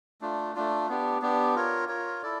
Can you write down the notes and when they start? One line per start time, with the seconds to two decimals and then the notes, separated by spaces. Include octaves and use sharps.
0.21 A3 D4 F4
0.55 A3 D4 F4
0.89 B3 D4 G4
1.21 B3 D4 G4
1.55 F4 A#4 C#5
1.89 F4 A#4 C#5
2.22 E4 A4 D5